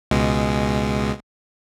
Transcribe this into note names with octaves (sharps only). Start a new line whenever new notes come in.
C#2 B2 G#3